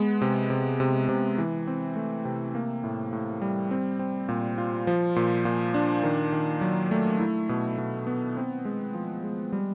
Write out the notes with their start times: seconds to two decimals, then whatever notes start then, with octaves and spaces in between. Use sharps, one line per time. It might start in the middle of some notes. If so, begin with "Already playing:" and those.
Already playing: G#3 B3
0.21 C3
0.50 C3
0.80 C3
1.09 C3
1.38 E3
1.67 C4
1.96 A3
2.25 C3
2.55 A#3
2.84 A2
3.13 A2
3.42 G3
3.71 C4
3.99 C4
4.29 A#2
4.58 F4
4.87 F3
5.16 A#2
5.45 A#2
5.74 D4
6.03 D#3
6.32 D#3
6.61 F#3
6.91 A3
7.20 E4
7.49 B2
7.78 B2
8.07 B3
8.37 C4
8.65 G#3
8.94 F3
9.24 G#3
9.53 G3